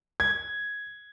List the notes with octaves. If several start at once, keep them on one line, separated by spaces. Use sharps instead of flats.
G#6